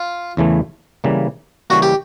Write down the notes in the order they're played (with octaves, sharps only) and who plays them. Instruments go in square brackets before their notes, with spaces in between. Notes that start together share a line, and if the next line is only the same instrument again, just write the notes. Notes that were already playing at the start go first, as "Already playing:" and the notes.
Already playing: [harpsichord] F4
[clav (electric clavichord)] E2 C#3 E3 A3
C#3 E3 G3 A#3
[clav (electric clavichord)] C#3 E3 G3 A#3 [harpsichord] F#4
[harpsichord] G4